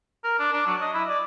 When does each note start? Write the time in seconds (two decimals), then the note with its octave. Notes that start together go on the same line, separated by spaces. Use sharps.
0.24 A#4
0.39 D4
0.53 D4
0.66 F#3
0.81 D#5
0.94 E4
1.08 D5